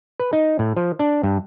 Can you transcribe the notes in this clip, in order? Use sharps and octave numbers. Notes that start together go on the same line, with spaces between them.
B4
D#4
A2
F3
D4
G2